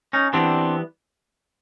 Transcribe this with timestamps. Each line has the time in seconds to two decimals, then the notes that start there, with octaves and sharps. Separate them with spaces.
0.13 C#4 D#4
0.33 E3 G3 B3 C4 D4